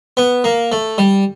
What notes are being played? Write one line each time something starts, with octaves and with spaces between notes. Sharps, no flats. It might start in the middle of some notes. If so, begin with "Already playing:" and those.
B3
A#3
A3
G3